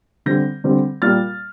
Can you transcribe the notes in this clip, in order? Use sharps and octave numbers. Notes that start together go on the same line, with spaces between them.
D3 G3 C4 G6 A#6
D3 G3 C4
A#2 G3 A#3 F6 A6